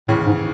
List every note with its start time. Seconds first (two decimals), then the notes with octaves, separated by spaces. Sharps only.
0.08 D#2 A2 C#3 E3
0.27 G#2